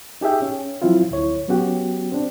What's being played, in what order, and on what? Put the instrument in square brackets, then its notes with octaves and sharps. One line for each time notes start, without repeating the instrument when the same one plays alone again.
[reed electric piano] D#4 G4 G#4 E5 G5
C#4
F3 F#3 C4 E4 F4
D2 E4 C#5
F#3 B3 C#4 F#4 G4
C4 D4